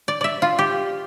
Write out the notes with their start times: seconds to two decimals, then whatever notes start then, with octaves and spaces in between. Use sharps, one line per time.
0.08 D5
0.21 D5 E5
0.42 F4
0.59 G4